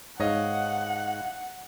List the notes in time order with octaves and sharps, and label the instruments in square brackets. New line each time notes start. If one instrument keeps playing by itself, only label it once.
[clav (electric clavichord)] G#2 [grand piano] C#5 D#5 F5 [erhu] F#5